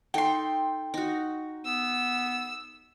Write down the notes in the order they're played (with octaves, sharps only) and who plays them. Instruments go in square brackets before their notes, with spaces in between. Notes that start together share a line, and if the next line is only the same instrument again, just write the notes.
[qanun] D#4 A4 [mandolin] G5 C6
[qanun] D#4 F#4
[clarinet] B3 [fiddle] E6